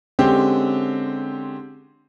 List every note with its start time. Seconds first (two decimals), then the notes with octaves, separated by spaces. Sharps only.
0.19 D3 G#3 C4 C#4 G4